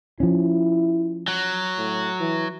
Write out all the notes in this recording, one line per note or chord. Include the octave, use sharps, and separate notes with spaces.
F3 C#4 E4
F#3
A2
E3